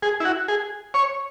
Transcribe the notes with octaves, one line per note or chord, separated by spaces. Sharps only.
G#4
E4
F#4
G#4
C#5